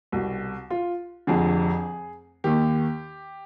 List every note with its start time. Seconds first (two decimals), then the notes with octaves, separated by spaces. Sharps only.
0.12 C2 B2
0.70 F4
1.27 F1 F2 D3 G#4
2.44 D#2 D#3 G4